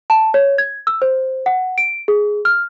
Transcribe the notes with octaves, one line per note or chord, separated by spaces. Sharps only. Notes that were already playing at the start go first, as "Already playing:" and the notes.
A5
C#5
G#6
E6
C5
F#5
D7
G#4
F6